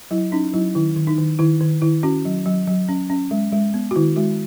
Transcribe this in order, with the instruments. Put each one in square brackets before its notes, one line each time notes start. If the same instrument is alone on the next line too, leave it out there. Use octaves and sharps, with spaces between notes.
[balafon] F#3 E4
C#4 D#4
F#3 E4
D#3 E4
D#3
D#4
D#3
D#3 E4
D#3
D#3 E4
C#4 F#4
F#3
F#3
F#3
C#4
C#4
G#3
G#3
B3
F#4
D#3 E4
G#3 F#4